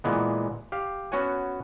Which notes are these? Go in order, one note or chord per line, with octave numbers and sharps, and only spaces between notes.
A#2 E3 G#3 B3
G4 F5
B3 C#4 F#4 C#5 F#5 G#5